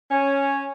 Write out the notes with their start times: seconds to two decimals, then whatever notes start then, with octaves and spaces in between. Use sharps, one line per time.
0.10 C#4